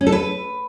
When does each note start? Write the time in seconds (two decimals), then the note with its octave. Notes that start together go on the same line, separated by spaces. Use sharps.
0.01 C#4
0.07 A4
0.12 B4